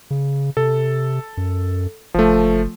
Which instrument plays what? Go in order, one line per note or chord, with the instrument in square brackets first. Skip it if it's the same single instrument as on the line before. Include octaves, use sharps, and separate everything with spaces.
[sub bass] C#3
[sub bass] C3 [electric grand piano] A4
[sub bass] F#2
[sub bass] F#1 [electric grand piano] F3 A3